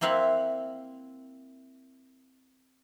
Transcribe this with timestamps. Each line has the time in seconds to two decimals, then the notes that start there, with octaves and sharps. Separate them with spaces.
0.01 A#3 C4 E4 F5 F#5